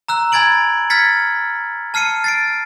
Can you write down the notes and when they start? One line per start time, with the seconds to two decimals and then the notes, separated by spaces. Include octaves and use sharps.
0.08 A#5 E6 F#6
0.32 G#5 B5 G#6 A6 D7 F#7
0.90 F6 G#6 A6 B6 C#7
1.94 A5 F6 C7 C#7 D#7
2.24 A6 C7 D7